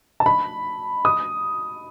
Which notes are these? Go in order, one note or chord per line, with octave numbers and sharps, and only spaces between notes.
A5
B5
D#6